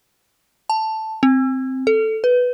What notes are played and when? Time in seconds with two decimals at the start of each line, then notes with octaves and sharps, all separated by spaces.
0.69 A5
1.23 C4
1.87 A4
2.24 B4